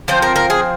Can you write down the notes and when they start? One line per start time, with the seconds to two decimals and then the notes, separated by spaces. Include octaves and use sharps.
0.08 F3 C4 C5
0.22 A#4
0.36 A#4
0.50 G#4